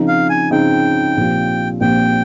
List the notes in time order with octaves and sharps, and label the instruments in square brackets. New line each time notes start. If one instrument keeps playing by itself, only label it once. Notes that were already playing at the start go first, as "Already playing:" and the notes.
Already playing: [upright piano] C#3 F3 C4 D#4
[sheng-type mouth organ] F5
G#5
[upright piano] C#3 F3 C4 D#4 [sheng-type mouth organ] G5
[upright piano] A#1 A#2 F3 C4 G4
[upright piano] A#1 A#2 F3 C4 G4 [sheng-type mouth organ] G5